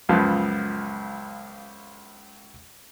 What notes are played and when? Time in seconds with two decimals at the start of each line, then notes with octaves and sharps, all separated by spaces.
0.09 C#2 F#2 F3 B3